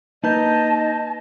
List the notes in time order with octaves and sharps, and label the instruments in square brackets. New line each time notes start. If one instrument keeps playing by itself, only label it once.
[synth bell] A#3 B4 G6 [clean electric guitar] D#4 [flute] D#5 [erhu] A5